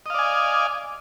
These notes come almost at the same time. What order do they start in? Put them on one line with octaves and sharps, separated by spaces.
D#5 F5 D5 G#5